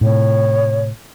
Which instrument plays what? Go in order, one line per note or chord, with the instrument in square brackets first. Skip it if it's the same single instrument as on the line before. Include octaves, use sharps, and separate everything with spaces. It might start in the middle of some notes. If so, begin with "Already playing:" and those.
[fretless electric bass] A2 C3 [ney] C#5